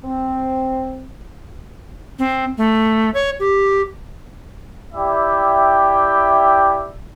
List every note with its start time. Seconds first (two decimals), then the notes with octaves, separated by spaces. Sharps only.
0.04 C4
2.19 C4
2.58 A3
3.14 C#5
3.40 G4
4.95 E4 G4 D5 E5 G5